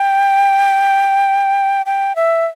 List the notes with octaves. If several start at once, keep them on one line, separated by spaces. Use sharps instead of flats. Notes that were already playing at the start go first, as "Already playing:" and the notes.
Already playing: G5
G5
E5